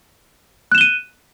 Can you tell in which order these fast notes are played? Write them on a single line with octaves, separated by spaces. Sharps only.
F#6 E7 G7 D#7